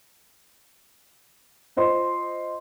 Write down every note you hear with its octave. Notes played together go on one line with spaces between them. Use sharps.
F4 C5 D#5 C6